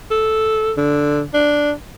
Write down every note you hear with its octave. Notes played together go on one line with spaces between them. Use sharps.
A4
D3
D4